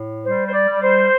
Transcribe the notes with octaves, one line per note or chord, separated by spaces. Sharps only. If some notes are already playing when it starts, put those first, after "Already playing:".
Already playing: A2
G3 C5
C5
D5
G3
C5